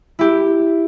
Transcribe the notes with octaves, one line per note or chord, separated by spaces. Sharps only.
E4 G4